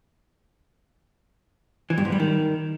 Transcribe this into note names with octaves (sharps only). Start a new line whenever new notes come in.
E3
G2
G#2
G3
D#3